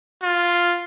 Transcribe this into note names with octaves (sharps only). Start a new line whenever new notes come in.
F4